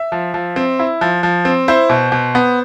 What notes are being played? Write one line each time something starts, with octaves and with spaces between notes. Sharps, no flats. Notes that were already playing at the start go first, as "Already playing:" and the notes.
Already playing: E5
F3
F3
C4
E4
F3
F3
C4
E4 C5
B2
B2
B3